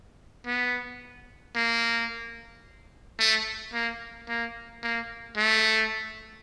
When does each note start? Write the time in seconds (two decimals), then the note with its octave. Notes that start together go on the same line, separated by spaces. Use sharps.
0.46 B3
1.56 A#3
3.19 A3
3.73 A#3
4.29 A#3
4.83 A#3
5.37 A3